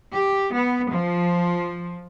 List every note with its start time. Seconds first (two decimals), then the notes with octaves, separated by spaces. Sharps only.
0.13 G4
0.52 B3
0.90 F3